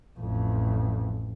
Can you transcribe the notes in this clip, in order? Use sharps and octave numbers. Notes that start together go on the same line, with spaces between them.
A1 F2